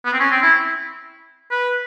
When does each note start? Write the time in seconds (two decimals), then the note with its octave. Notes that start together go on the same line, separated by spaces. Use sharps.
0.06 B3
0.13 C4
0.20 C#4
0.31 C4
0.42 E4
1.51 B4